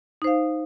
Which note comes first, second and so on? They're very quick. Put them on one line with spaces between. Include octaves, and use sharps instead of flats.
D#4 C5 F5